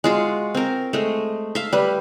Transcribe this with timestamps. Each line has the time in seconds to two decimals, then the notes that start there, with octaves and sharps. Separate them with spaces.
0.04 G#3 F4 F#4
0.55 C4 A#4
0.93 G#3 A3
1.55 E5 F5
1.73 G3 B4